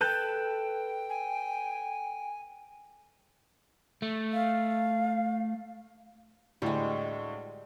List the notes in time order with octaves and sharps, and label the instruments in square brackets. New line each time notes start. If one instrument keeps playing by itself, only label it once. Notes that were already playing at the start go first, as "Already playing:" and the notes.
[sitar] A4 [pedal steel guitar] B4 A5 G6 [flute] G5
[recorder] G#5
[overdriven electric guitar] A3
[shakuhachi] F5
[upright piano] D2 A2 [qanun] G3 G#3